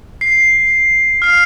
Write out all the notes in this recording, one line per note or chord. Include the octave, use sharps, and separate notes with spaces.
C7
F6 C7